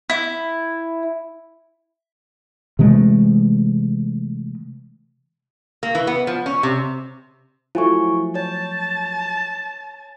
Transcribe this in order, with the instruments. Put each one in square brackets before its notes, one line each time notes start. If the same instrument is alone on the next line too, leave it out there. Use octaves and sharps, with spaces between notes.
[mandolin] E4
[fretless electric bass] C3 E3 G#3 A3
[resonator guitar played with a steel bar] A#3
E3
B3
F3
C#4
C3
[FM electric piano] F3 F#3 A3 [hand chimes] E4 G#5 C#6
[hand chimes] C#5 [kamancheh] A5